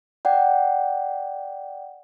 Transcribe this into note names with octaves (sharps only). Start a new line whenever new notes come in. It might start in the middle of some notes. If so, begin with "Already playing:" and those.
D5 F#5 G5